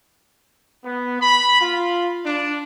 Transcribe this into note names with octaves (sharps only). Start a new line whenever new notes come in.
B3
B5
F4
D4